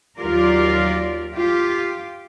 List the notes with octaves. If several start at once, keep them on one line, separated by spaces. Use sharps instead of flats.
D#2 F#3 F4 G4 A#4 D5
F4 G4